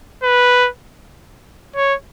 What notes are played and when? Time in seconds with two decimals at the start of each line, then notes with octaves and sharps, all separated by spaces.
0.23 B4
1.76 C#5